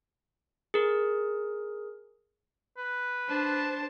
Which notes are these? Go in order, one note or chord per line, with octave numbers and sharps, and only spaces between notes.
G#4 A#4
B4
D4 C5 A5